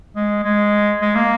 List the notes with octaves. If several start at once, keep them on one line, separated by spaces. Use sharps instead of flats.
G#3
G#3
G#3
A#3